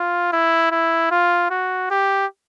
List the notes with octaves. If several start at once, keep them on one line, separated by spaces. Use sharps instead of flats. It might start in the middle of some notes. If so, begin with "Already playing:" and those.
Already playing: F4
E4
E4
F4
F#4
G4